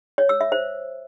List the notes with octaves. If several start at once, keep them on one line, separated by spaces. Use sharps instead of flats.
C#5
E6
E5
C5